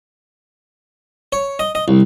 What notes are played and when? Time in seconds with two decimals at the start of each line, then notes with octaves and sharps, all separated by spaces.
1.33 C#5
1.59 D#5
1.75 D#5
1.88 C2